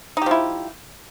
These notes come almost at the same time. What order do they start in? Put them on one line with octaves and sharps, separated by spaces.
D#4 G4 F3 E4